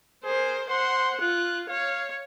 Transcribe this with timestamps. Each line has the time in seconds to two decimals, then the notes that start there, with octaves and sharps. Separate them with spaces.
0.24 G#4 A#4 C5
0.70 C5 F#5 C6
1.21 F4 F#6
1.70 C#5 F5